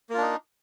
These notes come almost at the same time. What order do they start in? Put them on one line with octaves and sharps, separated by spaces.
A#3 F4 D4 D#4